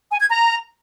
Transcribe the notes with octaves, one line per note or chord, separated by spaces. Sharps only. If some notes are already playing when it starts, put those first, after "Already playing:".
G#5
G#6
A#5